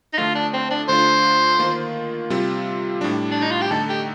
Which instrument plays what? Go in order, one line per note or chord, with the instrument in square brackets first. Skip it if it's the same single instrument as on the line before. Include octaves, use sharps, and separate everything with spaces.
[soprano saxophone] D#4
[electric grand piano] D3 F3 A3 [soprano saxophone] F4
[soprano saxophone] D4
C4
D4
[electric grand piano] D3 A3 D4 F4 [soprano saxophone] C5
[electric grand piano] D#3 A#3 F4
C3 G3 C4 F4
A2 G3 D4
[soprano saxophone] D4
D#4
F4
G4
[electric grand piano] D3 A3 D#4 [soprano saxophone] A4
[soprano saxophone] G4